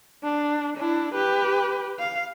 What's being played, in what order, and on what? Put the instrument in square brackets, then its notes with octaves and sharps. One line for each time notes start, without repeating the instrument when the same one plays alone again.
[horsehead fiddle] D4
D4 E4
G4 B4
F5